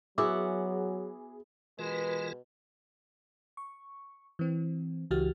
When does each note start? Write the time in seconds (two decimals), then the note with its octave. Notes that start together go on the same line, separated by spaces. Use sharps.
0.18 F#3 B3 E4 F#4 G#4 D6
1.79 B2 E3 G#3 F4 A#4 B4
3.57 C#6
4.39 E3 C4
5.11 C#2 E3 F#4 G4 F6 A6